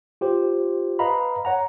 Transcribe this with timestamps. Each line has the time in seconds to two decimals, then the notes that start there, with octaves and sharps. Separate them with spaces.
0.21 F4 G4 C5
0.99 B4 D#5 F5 A#5 B5
1.45 C#5 F#5 A#5